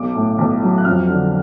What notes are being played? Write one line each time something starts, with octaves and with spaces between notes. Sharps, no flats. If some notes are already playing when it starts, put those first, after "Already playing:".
Already playing: B1 D6
A2
B1
F#3
F#6
F2 F6
D3